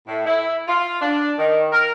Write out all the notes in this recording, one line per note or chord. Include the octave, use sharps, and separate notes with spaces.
A2
E4
F4
D4
D#3
A#4